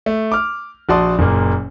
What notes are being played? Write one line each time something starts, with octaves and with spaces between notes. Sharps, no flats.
A3
D6 F6
A#1 F#4 D5 A5 C6 D#6
F#1 A#2 A#3